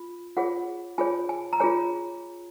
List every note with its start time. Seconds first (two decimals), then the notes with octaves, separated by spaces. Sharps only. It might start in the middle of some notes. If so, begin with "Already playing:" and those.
Already playing: F4
0.37 F4 G#4 C#5 F#5
0.98 F4 G#4 C#5 G#5
1.29 G#5
1.53 A#5
1.60 F4 G#4 C#5 G#5